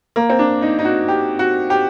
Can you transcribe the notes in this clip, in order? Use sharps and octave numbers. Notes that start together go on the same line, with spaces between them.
A#3
C4
D4
D#4
D#4
F#4
G4
F#4
G4